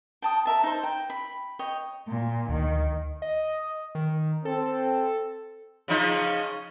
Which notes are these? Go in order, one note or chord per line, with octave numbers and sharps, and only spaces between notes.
G5 A5 D#6
A#4 E5 A5
D#4 C5
G5
B5
C#5 D#5 G5
A#2
D2 D#3
D#5
D#3
C4 A4
C#3 F3 D#4